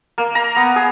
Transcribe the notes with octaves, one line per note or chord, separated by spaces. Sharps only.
A#3
A#5
B3
G#4